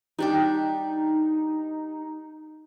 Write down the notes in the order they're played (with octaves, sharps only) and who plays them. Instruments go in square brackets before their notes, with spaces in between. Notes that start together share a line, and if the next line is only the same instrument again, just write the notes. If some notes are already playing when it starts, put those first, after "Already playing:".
[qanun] G3 D4 G4 [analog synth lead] D#4